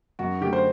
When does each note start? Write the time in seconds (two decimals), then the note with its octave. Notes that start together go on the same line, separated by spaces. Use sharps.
0.19 F#2 F#4
0.41 D3 A3 G4
0.53 C5